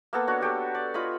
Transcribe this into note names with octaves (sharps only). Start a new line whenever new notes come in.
A#3 B3 A4
D4 F#4 C#5
F#4 G4 A4
D5
F4 C#5 D#5 B5